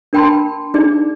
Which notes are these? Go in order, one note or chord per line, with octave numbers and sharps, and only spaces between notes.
D4 A#4 G5 A5 B5 C6
D4 D#4 G#4 D5